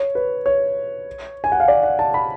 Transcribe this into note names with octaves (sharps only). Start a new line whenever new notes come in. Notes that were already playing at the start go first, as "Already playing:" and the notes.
Already playing: C#5
B4
C#5
G#5
F#5
F5
D5
F#5
A5
B5